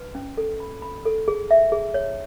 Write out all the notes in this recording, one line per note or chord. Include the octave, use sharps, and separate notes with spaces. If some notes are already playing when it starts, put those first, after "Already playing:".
Already playing: B4
C#4
A4
B5
B5
A4
G#4
E5
G#4
C#5